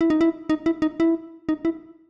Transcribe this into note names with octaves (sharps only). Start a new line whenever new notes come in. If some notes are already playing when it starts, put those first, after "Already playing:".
E4
D#4
E4
D#4
E4
D#4
E4
D#4
E4